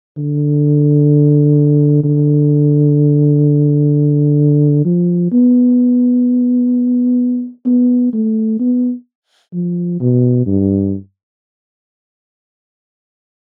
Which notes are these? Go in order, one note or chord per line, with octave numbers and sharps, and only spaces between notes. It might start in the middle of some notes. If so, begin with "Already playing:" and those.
D3
D3
F3
B3
B3
A3
B3
F3
B2
G2